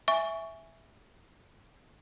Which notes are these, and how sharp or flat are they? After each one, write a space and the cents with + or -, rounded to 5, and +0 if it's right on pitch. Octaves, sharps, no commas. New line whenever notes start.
E5 +0 G#5 -5 C#6 +15